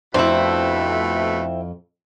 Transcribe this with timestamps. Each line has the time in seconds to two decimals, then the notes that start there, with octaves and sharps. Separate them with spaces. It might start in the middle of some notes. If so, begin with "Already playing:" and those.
0.14 F2 B2 A3 C4 D4 E4